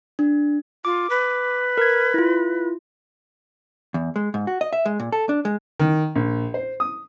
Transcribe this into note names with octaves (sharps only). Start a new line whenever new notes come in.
D4
F4 D6
B4
A#4 G#6
E4 F4
E2
G#3
G#2
F#4
D#5
E5
G#3
A#2
A4
D4
G#3
D#3
A#1
C5
D#6